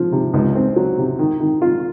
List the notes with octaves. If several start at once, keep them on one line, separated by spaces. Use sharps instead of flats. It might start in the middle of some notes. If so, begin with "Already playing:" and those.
Already playing: F3
C3
C#2
C4
F#3
C3
D#3
D#3
F4